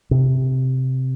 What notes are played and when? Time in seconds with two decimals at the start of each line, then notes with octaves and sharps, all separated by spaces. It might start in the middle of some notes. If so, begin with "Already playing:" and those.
0.11 C3